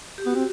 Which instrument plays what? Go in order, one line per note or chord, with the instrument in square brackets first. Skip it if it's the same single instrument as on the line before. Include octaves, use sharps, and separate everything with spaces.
[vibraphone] G4
[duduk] B3 [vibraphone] F#4
[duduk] C4